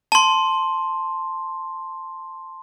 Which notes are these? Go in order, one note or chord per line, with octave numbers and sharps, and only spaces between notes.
A5 C6